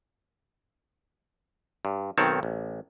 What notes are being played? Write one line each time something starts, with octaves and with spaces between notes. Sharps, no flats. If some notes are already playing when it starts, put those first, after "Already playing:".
G2
B1 D#3 C4 C#5 A5
A1